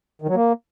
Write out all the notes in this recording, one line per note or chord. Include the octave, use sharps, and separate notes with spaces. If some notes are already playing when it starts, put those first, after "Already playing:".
D#3
F#3
A#3